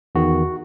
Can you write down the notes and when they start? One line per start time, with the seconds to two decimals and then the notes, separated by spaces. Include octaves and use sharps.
0.15 E2 D#3 F#4